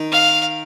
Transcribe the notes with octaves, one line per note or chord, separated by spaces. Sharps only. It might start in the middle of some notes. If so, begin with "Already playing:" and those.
Already playing: D#3
F5